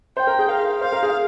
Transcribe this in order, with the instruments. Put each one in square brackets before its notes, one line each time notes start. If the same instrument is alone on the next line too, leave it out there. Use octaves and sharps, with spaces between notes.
[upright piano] C5 [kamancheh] G5
[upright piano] A#4
G#4
[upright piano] A#4 [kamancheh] F5
[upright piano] C5 [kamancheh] F5
[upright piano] A#4
G#4